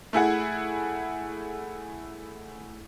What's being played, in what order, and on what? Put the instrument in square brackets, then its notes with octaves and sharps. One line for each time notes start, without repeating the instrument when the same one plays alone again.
[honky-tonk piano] A3 E4 G#4 F#5